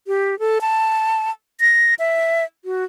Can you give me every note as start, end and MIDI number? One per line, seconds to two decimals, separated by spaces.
0.07 0.38 67
0.39 0.58 69
0.61 1.30 81
1.60 1.94 94
1.99 2.44 76
2.65 2.84 66